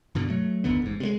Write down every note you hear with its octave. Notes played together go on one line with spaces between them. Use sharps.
G2 B2 D3
F#3 A3
F#1 D#2 D3 B3
A1 G#2
C3 G#3